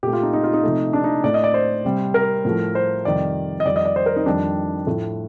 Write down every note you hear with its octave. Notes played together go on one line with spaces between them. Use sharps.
A#2 A3 G4
F4
D#4
D#4
F4
D#4
C3 F3 A3
D4
D#4
A2 A3 D5
D#5
D5
C5
C3 G3
A#4
A2 F3 A3
C5
F2 C3 D#3 G3 D5
D#5
F2 D#3 G3 D5
D#5
D5
C5
A#4
D#4
F2 D#3 G3 D4
A2 F3 A3